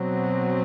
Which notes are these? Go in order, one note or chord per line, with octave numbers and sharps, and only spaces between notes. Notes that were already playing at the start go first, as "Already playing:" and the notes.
Already playing: B2 F#3 C4